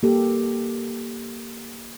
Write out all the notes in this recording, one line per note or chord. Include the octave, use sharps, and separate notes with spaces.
A#3 G4 A4